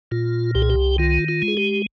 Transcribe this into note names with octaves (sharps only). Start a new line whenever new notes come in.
A#2 F4
C2 G4
G#4
G4
D#3 F4
F4
G#3
G#4
G4